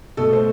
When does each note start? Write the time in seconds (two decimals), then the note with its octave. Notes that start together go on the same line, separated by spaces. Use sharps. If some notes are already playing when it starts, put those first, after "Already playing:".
0.17 B2 A3 A4
0.33 C5